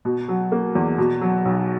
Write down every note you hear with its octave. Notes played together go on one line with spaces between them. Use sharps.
B2
F#3
A#3
E2
B2
F#3
B1